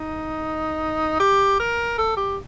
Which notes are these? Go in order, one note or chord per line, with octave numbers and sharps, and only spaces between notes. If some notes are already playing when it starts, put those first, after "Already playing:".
Already playing: D#4
G4
A#4
A4
G4